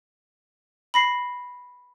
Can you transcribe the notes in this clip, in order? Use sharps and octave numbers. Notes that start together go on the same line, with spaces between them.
B5 A#6 C7